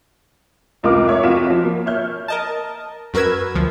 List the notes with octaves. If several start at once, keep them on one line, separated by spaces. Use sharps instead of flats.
F1 C#2 F4 A#4 D6
C#5 E5
F2 F4 F#4 B6 E7
F3
A#3
C#5 E5 F6 G6
A#4 D#5 A5
F#2 F#4 A#4 B4 E6 G#6
D2 F3